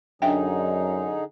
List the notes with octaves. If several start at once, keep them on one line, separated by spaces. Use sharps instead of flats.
F#2 D3 D4 D#4 G#4 E5 G5